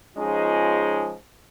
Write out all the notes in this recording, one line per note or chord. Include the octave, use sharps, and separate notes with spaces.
F3 G#3 C#4 D#4 F4 G#4